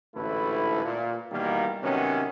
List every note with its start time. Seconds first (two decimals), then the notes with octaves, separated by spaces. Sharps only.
0.15 A1 D2 G#2 A3 E4 B4
0.84 A#2
1.31 B2 D#3 E3 G3 A#3
1.83 C3 D#3 F#3 B3 C#4